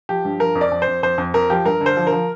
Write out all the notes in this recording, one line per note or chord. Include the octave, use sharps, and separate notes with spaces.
F3 G4
G2
F3 A#4
F2
D5
F2
C5
F2
F2 C5
F2
F2 A#4
F3 G4
G2 A#4
D3
C5
F3
A#4
F3